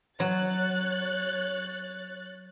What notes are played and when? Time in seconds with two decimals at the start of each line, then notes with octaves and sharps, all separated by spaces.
0.20 F#3 C#5 F#6 A6